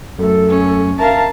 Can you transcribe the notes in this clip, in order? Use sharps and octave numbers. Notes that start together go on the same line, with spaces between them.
F#2 F#3 A3 A4
C#4
A#4 E5 F5 A5